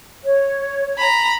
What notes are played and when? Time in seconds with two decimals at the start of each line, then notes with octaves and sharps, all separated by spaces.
0.25 C#5
0.98 A#5 B5